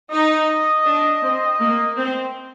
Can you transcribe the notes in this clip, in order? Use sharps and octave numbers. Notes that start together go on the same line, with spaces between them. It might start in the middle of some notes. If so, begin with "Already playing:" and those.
D#4 D#5
D4
C4
A#3
C4